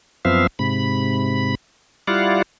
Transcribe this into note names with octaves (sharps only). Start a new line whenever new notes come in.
F#2 F3 B3 C4 E5 F5
G#2 C3 B5
G3 E4 F4 D5 F5 F#5